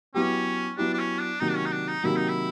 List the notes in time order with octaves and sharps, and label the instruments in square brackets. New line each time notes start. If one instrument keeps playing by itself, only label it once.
[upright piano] F#3 B3 E4 G4 [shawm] C#4
[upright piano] F#3 B3 E4 G4 [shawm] D4
[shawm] D4
C#4
D4
[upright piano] C3 D#3 F#3 A#3 [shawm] D#4
[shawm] D4
C#4
D#4
D4
D#4
[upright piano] C3 D#3 F#3 A#3 [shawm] E4
[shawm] D#4
E4